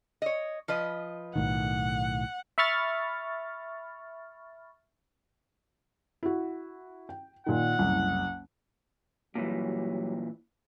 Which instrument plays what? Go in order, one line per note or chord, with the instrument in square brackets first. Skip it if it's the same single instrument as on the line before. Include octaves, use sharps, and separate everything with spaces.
[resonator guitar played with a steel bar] C#5 D#5
F3 B4 D#5
[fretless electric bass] B1 A2 D#3 [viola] F#5
[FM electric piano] E5 B5 C#6 F6 A6
[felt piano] E4 F#4
G5
[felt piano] A#2 D#3 [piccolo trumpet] F#5
[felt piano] F#1 C2
[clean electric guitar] A#2 E3 [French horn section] F#3 G3